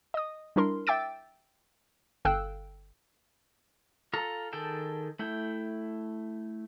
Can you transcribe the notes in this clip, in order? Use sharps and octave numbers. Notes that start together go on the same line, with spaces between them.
D#5 D#6
G3 D4 E4 A#4 C6
E5 G5 D6 E6 A6 D7
G1 A4 F5 G5 E6 F#6
F4 A4 A#5
D#3 G#4 A4 G5 A5
A3 E4 G5